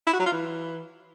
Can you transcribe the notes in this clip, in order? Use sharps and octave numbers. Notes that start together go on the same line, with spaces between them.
E4
F#4
F#3
F4
E3